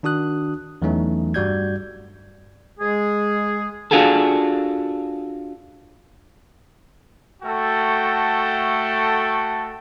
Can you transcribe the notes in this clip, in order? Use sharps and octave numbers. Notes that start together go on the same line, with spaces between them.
D#3 D4 F#4 D#6 F#6
E2 E3 F#3 A3 C#4 D#4
G2 G3 F#4 D5 G6 G#6
G#3 G#4
D4 F4 F#4 G#4 A4
A3 F#4 A4 G5